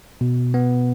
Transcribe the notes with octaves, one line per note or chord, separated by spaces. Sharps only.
B2
B3